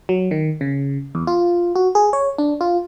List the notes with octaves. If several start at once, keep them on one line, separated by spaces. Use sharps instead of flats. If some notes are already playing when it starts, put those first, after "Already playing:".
F#3
D#3
C#3
E2
F4
F#4
G#4
C#5
D4
F4